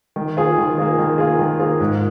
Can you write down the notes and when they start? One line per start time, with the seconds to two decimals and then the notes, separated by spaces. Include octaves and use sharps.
0.16 D#3
0.37 A#3 F4 G#4
0.58 D#3
0.78 A#3 F4 G#4
0.98 D#3
1.18 A#3 F4 G#4
1.39 D#3
1.59 A#3 F4 G#4
1.80 G#2